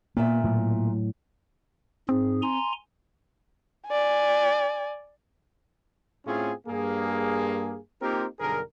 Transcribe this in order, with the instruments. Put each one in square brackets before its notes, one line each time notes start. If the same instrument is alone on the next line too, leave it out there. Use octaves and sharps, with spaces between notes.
[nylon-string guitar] A#2 B3 E5 [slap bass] A#3
[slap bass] A2 F#3
[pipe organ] G#2 G#4 [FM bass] C4
[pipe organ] G#5 A#5 C6
[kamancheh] D5 G#5
[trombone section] A2 A3 C4 C#4 F4 G#4
G2 A#3 G#4
A#3 C4 D#4 F4 G4 A#4
B1 G2 D3 G#4 A#4